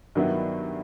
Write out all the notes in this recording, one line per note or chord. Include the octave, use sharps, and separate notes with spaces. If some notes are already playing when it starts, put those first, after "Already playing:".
G2 D#3 F#3 B3 E4